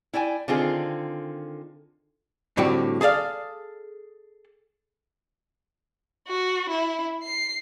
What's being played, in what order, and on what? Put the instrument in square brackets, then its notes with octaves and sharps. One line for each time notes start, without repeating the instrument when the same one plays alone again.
[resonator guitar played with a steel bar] E4 D5 G5 G#5
D3 D#3 C4 F4 G#4
[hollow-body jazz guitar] A2 D3 G3 C4 F#4 G5
G#4 A4 D5 F5
[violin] F#4
E4
C7